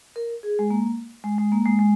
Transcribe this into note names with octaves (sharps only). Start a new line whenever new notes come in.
A#4
G#4
G#3
A#3
G#3
G#3
A#3
G#3
G#3